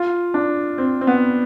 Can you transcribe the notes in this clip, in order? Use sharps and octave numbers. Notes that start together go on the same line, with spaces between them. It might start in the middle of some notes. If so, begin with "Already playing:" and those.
Already playing: F4
D4
C4
C4
B3